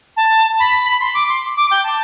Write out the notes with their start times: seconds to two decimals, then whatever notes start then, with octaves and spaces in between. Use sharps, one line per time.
0.17 A5
0.59 B5
0.92 B5
1.00 C6
1.14 D6
1.28 C6
1.57 D6
1.71 G5
1.84 A5